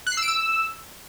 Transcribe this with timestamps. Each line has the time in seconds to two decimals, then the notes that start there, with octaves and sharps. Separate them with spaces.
0.07 F#6
0.12 C7
0.17 E6
0.23 D7
0.28 E6